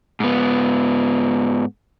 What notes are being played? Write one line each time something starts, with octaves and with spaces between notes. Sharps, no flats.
G#2 B3